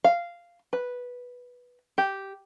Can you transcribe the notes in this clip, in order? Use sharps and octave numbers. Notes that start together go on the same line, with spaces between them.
F5
B4
G4